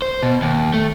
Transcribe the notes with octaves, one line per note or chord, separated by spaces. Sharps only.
C5
B2
D#2
A3